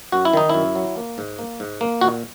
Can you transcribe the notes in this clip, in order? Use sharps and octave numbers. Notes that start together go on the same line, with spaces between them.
F#2 F#4
E4
D#3 D#4
F#2 E4
F#3
A#3
G#2
A#3
G#2
A#3
A#2 F#4